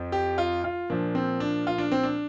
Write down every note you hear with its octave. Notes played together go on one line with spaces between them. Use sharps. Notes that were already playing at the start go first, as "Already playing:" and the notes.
Already playing: F2 F3
G4
F4
F4
A#2 F3 D4
C4
D4
F4
D4
C4
D4